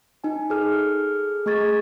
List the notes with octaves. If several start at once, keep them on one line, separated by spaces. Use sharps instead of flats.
D#4 G#5
G#4 A4 F6
A3 G#4 C#6 G#6 A6